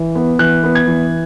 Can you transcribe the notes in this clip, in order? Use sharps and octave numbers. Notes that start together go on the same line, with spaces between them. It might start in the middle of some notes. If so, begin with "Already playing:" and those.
Already playing: E3
B3
E3 F#6
B3
G#6
E3